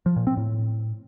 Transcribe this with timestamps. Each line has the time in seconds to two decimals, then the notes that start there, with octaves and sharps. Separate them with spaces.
0.06 F3
0.16 A#2
0.27 C4
0.37 A2